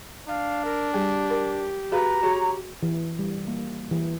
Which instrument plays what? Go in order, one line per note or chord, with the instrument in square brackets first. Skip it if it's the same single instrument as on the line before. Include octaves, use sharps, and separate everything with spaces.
[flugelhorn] D4 [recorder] F5
[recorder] A#4
[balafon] G3 G#4 G#5 [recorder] G4
[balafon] A#4
[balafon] F#4 G#4 F5 [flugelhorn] B4 [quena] A#5
[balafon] F#4 G#4 [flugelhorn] C#5
[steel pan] E3
G3
A#3
E3